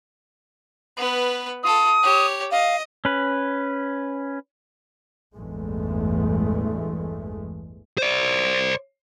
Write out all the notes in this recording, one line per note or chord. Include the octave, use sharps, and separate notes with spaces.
B3 B4
F4 A4 D#6
G4 C#5
D#5 F5
C#4 B4
A1 E2 G2 G#3 A3
C5 D5